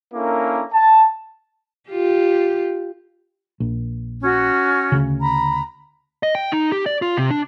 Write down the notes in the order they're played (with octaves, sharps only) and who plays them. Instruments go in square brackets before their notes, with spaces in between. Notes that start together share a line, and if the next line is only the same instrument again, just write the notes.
[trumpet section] A#3 C#4 D4 E4 A4 A#4
A5
[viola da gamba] F4 G4
[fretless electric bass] A#1
[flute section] C#4 F#4
[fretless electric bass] D2 C#3
[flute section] A#5 B5
[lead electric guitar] D#5
G5
D#4
G4
D5
F4
C3
D4